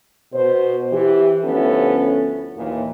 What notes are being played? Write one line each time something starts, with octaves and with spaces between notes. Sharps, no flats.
B2 C5
E3 G4
D2 F3 B3 C#4 E4 A4
D#2 A#2 E3